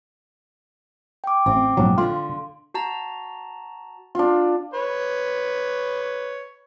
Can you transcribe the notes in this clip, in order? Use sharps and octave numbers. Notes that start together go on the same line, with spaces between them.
G5 D6
A1 C4
A#1 G#2 F#3
D3 F4 F5 C6
F#4 A5 A#5
D4 F4
B4 C#5